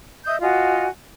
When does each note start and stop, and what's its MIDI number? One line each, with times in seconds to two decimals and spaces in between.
0.25 0.36 75
0.25 0.36 76
0.25 0.36 87
0.25 0.36 91
0.42 0.87 65
0.42 0.87 66
0.42 0.87 75
0.42 0.87 80